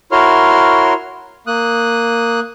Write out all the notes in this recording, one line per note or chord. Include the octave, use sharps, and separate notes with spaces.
E4 F#4 A#4 C#5 C6 F6
A#3 D#6 F#6